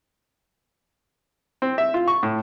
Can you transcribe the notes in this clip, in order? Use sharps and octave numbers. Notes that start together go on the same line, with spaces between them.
C4
E5
F4
C#6
A2